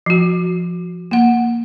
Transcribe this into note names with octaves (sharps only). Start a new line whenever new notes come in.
F3 F#4
A#3 F#5